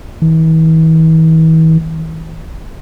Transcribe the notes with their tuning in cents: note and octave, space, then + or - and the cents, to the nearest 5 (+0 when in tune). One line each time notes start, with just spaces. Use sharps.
E3 -45